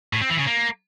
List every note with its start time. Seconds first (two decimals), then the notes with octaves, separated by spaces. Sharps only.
0.13 A2
0.21 C4
0.30 E3
0.38 C#3
0.47 A#3